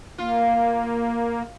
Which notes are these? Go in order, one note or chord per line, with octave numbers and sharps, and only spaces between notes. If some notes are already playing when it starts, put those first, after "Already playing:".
A#3 F4